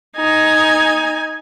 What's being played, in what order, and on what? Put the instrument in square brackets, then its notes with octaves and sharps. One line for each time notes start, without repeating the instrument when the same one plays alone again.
[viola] D#4 G#5